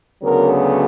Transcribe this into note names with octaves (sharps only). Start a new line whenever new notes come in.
D2 C#3 F#3 B3 A#4